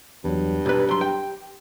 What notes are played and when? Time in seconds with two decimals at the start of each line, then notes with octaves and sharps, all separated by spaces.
0.24 E2 G2 F#3
0.66 B1 G4 B4
0.89 F#3 C6
1.01 G5